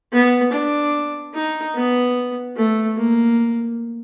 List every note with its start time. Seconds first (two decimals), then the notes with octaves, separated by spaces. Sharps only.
0.13 B3
0.53 D4
1.34 D#4
1.75 B3
2.56 A3
2.97 A#3